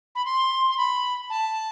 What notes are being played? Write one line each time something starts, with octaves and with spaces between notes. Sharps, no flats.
B5
C6
C6
B5
A5